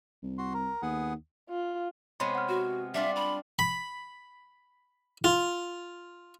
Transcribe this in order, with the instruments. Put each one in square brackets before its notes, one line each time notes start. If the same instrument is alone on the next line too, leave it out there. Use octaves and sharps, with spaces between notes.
[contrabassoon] C2
[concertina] F#4 C6
A#4
[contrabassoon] D#2 [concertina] B3 G#4 F#5
[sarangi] F4
[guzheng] C3 G#3 B3 [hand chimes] C#5 B5 C6
[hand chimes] F#5 F6
[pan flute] F#4
[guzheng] G3 D4 F4 [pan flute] E5
[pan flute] B5
[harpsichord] B5
F4